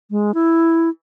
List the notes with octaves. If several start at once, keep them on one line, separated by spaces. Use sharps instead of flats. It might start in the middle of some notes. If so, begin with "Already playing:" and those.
G#3
E4